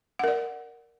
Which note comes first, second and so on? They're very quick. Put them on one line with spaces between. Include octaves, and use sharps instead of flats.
F#5 A#4 D5